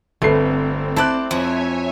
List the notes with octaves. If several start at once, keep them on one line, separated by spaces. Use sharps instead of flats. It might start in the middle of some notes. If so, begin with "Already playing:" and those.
G1 A3 C4 B4 C7
E4 C5 D5 A5 F#6
F2 C#5 E5 G#5